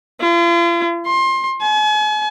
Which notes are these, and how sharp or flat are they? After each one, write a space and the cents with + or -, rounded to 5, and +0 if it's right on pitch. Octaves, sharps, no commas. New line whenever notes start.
F4 -45
C6 +25
G#5 +40